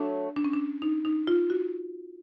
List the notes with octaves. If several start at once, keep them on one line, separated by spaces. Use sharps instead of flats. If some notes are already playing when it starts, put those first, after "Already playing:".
Already playing: F#3 A3 D4
D4
C#4
D4
D#4
D#4
F4
F#4